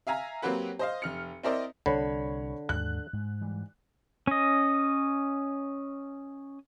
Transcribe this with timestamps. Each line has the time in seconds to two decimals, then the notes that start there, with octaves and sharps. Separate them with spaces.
0.07 E5 F5 G#5 A#5
0.42 F#3 A#3 C4 G4 B4 F#5
0.79 C5 D#5 F5
1.02 F1 F6 C#7
1.43 C4 E4 A#4 C5 D5 D#5
1.86 C2 D3 C#5 B5
2.69 D#2 G#2 F#6
3.13 G#2
3.41 G#2 E3 G3
4.27 C#4 D#5